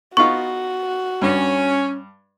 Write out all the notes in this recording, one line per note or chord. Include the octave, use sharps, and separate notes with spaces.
B3 D#4 F4 F#4 C#6
G2 C#4